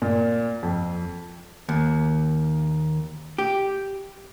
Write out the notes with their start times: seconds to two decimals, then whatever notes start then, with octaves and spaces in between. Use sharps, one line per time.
0.02 A#2
0.63 F2
1.69 D#2
3.38 G4